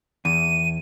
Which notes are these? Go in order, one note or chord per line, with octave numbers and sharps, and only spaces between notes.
E2 D#7